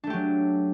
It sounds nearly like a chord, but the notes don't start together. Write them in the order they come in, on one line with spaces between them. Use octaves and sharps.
D4 A3 G4 F#3